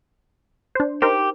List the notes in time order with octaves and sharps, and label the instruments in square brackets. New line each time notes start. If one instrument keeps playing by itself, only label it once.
[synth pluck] D4 C5
[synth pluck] D#4 A#4 C5 [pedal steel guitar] G4